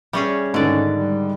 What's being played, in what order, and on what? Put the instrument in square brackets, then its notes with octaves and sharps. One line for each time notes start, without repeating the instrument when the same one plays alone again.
[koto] G3 C#4 G#4 [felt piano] E5
[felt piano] G#2 D#3 [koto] D3 D5 [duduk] C#4
[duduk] G3